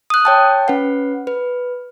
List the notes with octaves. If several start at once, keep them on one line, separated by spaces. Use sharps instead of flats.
D#6 F#6
C#5 G5 A5
C#4 B4 F#5
B4